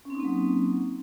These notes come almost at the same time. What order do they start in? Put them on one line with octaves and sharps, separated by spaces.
C#4 C4 D#4 A#3 F#3